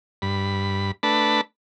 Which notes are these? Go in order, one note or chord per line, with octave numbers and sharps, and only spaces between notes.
G2 B5
A3 D4 B4 A5 B5